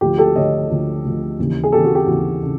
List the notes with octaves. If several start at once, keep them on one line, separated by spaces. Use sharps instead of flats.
D2 D3 F3 G4
G4 A4
D2 D3 F3 C#5 D#5
D2 D3 F3
D2 D3 F3
D#2 C#3 E3
G#4
D#2 C#3 E3 G4 A4
F#4 G#4
G4
D#2 C#3 E3 F#4
C#3